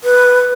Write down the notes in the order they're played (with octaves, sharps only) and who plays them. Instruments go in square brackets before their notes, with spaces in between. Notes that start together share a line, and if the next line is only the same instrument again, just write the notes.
[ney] B4